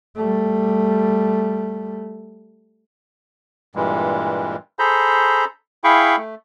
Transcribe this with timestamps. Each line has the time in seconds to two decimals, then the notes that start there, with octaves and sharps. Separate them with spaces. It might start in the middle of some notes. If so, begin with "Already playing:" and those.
0.16 G3 A3
3.75 G2 A#2 E3 G3 G#3
4.79 G#4 A4 C5 A#5 B5 G6
5.84 E4 G#4 F5 G5 B5 C#6
6.17 A3